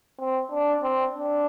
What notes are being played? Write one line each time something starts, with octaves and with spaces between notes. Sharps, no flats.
C4
D4
C4
D4